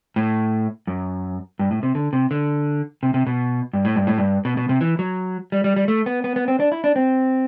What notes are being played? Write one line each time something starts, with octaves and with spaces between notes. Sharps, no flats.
A2
F#2
G2
A2
C3
D3
C3
D3
C3
C3
B2
G2
A2
G2
A2
G2
B2
B2
C3
E3
F#3
G3
G3
G3
A3
B3
B3
B3
C4
D4
E4
D4
C4